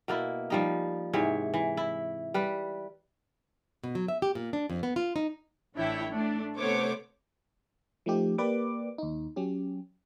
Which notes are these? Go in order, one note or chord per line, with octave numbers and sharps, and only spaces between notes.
B2 A#3 E4
F3 G3 D#4
G#2 C3 E3 C#5
E3
E4
G3 B4
B2
F#3
E5
G4
A#2
D4
F2
B3
F4
D#4
A1 E3 D4 E4 C#5 G5
A3 D4
C3 A3 B3 C5 C#5 D6
F3 A3 D#4 G4
A#3 G4 B4 D5 D6
D#2 D#4
F#3 C#4 G4